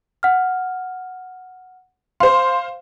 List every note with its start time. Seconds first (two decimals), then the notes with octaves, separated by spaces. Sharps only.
0.23 F#5 F6
2.20 C5 F5 C6